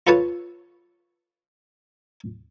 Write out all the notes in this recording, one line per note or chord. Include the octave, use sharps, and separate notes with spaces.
F4 A4 B4 C#5 A5